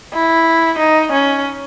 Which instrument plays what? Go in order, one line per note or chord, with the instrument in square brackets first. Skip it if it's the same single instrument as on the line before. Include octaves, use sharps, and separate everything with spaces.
[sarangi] E4
D#4
C#4